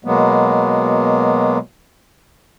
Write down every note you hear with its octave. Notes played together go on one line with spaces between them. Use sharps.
B2 F#3 G#3 A#3 B3